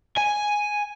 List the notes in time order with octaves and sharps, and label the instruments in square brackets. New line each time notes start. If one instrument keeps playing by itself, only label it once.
[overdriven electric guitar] G#5